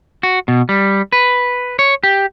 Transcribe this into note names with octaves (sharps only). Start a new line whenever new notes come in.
F#4
B2
G3
B4
C#5
G4